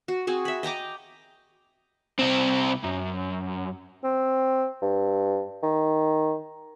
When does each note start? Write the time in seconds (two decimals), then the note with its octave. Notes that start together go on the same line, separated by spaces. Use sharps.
0.08 F#4
0.27 C4 F#4 G#4
0.45 E5 B5
0.63 D#5 G5 A#5 D6
2.19 C2 C4
2.84 F#2
4.03 C4
4.82 G2
5.63 D#3